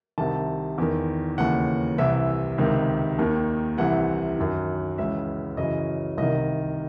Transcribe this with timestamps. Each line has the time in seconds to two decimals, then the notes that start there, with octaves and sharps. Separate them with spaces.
0.18 C2 C3 D#3 A5
0.78 E2 D#3
1.38 D#2 C#3 E3 F#5
1.98 C2 C3 E3 E5
2.58 C#2 C3 D#3
3.19 D#2 D#3
3.78 C2 C3 E3 F#5
4.39 F#2 D#3
4.98 C#2 C#3 E3 E5
5.57 F#2 C#3 E3 D#5
6.17 C2 C3 D#3 D#5